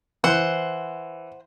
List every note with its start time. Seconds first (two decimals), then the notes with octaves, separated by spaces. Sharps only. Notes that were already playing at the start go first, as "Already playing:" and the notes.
0.24 E3 C5 F#5 C6